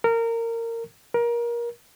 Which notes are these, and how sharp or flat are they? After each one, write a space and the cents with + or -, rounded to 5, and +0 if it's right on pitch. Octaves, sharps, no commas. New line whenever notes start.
A#4 -20
A#4 +25